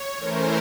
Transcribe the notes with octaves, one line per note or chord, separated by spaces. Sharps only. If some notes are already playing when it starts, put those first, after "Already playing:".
Already playing: C#5
E3 A3 C#4 A#4 C5